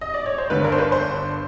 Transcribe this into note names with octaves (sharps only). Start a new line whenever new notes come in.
D#5
D5
C#5
C5
G1 G2 D3 B4
A#4
C5
B4
C5